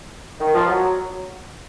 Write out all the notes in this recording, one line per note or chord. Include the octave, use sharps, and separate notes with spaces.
D#3
F3
F#3